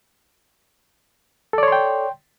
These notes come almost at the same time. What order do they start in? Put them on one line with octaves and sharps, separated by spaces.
A4 D5 C#5 C6 G5